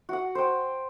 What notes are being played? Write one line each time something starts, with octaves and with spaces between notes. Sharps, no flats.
F#4 F#5
C5 G5